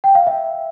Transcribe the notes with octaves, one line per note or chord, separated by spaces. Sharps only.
G5
F5
E5